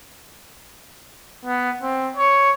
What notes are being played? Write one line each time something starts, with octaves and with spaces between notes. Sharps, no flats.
B3
C4
C#5